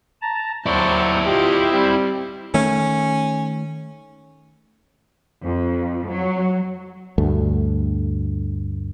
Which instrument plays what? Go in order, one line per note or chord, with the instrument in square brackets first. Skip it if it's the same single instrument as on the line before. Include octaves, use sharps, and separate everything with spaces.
[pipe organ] A5 A#5
[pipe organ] D#2 F#3 C#6 [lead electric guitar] E4 D5 [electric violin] C5 A5
[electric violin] F4 D#5 [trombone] G4 [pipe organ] C5
[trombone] G3 [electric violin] C4
[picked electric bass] D#3 A3 [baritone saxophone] C#4
[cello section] F2
F#3
[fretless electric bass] D2 G2 A3